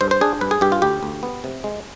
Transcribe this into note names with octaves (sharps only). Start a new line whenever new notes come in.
G2 C5
C5
D4 G#4
G2 B4
G#4
G2 G4
F4
D2 G4
D2
B3
C3
G#3